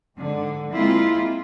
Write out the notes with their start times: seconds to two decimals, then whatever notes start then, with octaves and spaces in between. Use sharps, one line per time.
0.17 G#2 D3
0.72 G#3 A#3 C4 E4 F4